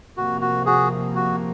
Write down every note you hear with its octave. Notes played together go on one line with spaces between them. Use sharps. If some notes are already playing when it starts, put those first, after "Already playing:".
C3 F3 A#3 F#4
F#4
F#4 G#4
F#4